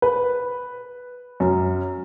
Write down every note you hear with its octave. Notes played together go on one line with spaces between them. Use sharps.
B4
F#2